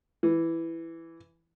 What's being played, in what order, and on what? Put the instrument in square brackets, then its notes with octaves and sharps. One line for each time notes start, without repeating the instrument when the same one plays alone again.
[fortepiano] E3